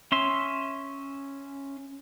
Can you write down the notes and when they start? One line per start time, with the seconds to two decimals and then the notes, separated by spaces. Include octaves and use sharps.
0.12 C#4 E5 C6